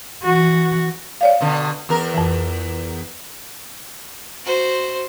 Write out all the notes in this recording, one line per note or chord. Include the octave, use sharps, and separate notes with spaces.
E3 F#4
C#5 D5 F5
B2 D3
E2 A#4
F2 E3
F#4 C5